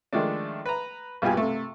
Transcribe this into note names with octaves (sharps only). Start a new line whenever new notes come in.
D#3 F3 G#3 A3 D4
B4 A#5
A#1 G2 B2 F4 G4 G#5
C3 A3